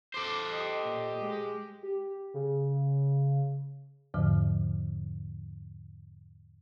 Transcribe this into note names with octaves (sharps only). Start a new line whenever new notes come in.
A4 C5 D6
G4 D#5
A#2
G#3
G4
C#3
E2 G#2 D3 F3